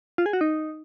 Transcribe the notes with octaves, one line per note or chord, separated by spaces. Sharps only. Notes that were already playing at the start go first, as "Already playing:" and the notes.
F4
G#4
F#4
D#4